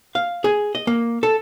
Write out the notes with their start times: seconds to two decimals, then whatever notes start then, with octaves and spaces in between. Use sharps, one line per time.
0.15 F5
0.44 G#4
0.75 D#5
0.87 A#3
1.23 A4